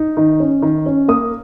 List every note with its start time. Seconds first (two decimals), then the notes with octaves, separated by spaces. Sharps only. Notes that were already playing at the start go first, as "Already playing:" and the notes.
Already playing: D#4
0.17 D#3
0.40 C#4
0.62 D#3
0.86 C#4
1.08 A#3 D#6